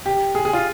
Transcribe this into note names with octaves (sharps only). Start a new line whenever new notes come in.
G4
G#4
G#4
F4